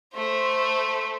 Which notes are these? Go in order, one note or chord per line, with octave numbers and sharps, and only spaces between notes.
A3 C5